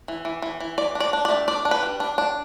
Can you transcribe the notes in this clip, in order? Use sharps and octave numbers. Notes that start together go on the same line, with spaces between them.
E3
E3
E3
E3
E3 D5
D4
D5
D4
D5
A3
D4 D5
D4
B4
G3
D4
D4